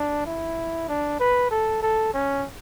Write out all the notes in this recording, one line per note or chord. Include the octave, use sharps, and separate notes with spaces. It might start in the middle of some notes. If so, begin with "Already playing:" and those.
Already playing: D4
E4
D4
B4
A4
A4
C#4